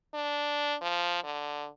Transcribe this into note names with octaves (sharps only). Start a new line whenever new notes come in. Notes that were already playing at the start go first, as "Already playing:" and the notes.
D4
F3
D3